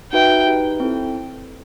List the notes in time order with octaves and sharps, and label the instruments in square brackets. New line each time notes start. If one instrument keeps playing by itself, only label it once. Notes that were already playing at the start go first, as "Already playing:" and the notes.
[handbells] D#4 F#4 B4 E5 [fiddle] G5
[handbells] D#4 G4 B4
C4 E4 A4